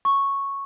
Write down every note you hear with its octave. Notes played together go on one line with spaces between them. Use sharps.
C#6